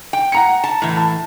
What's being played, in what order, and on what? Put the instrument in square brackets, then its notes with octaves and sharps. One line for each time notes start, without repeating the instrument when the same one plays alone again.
[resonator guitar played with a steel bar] G5
[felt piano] F#5 A#5 C#7
[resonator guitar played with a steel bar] A5
A2 E3
[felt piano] A5